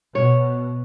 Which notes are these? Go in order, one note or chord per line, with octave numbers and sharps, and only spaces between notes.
B2 C#5